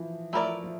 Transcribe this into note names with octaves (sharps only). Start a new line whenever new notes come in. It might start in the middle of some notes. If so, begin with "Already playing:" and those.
Already playing: E3 F3
F3 A3 E4 A#4 D5
F3